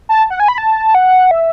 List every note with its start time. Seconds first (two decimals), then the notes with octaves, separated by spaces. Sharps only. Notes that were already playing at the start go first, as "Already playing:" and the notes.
0.09 A5
0.30 F#5
0.40 G#5
0.48 B5
0.58 A5
0.95 F#5
1.31 E5